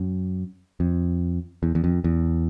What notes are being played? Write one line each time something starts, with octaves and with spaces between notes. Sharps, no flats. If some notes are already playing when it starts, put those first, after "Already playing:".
Already playing: F#2
F2
E2
E2
F2
E2